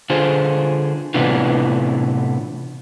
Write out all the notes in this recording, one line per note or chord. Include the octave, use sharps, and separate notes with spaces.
D3 F4 G#4 C5
A2 C3 E3 B3 D4 F4